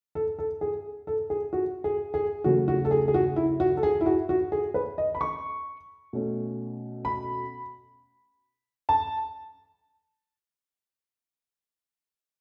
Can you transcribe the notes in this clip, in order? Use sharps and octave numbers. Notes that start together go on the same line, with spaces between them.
A4
A4
G#4
A4
G#4
F#4
G#4
G#4
C#3 F#3 A3 F#4
F#4
A4
G#4
G#4
F#4
E4
F#4
A4
G#4
E4
F#4
F#4
G#4
B4
D#5
B5
C#6
B2 A3 C#4
B5
A5